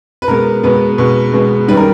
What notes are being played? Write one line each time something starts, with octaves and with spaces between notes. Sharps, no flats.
B4
B2 G#3 B3 A#4
B2 G#3 B3 B4
B2 G#3 B3
B2 G#3 B3
F#2 D#3 G3 B4
A#4